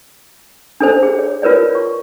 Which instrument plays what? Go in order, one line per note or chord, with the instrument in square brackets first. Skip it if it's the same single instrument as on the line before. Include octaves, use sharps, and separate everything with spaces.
[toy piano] D4 A4 C5
G#4
C#5
F4 A#4 B4 C#5 D5
C#6